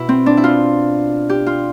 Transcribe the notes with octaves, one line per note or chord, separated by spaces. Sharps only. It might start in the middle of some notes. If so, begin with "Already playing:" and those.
Already playing: B2 E4
C4
D4
E4
F4
G4
F4